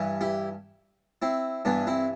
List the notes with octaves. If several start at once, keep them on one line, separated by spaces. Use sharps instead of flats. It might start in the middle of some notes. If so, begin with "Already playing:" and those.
Already playing: G2 E3
E4 G4
C4 E4
G2 E3 B3 D4
C4 E4